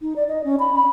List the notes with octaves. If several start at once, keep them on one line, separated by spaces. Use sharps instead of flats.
D#4
D5
D#5
C#4
B5
B5